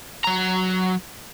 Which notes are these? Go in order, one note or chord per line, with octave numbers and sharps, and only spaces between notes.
F#3 A#5